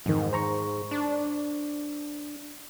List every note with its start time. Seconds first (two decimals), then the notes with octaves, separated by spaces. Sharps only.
0.06 F2 G#2 D#3
0.33 C5 A#5 C#6
0.91 D4